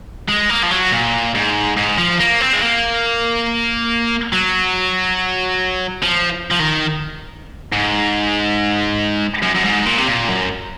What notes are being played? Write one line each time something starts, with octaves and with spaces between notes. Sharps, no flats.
G#3
A#3
F3
F#3
A#2
G#2
G#2
F3
A#3
C4
G#3
A#3
F#3
F3
F3
D#3
G#2
F#2
F#2
G#2
A#2
C3
A#2
F#2